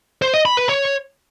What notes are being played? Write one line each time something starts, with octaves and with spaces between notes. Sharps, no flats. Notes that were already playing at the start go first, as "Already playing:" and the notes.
C5
D#5
B5
B4
C#5